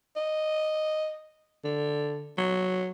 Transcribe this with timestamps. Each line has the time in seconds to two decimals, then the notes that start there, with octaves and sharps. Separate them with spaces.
0.16 D#5
1.65 D3
2.38 F#3